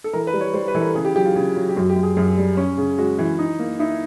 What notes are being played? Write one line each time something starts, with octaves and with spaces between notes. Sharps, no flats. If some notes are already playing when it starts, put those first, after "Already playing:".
A4
E3 A#4
B4
G3
C#5
G3 C5
B4
E3 A4
A#4
C#3 G#4
G4
F#3 G4
F4
C#3
F#3
G4
F#2 F#4
G4
F#2
G#4
F#2 G#4
G3
C#4
C#3
G#3 F#4
E3
D#4
A#3
D#4 E4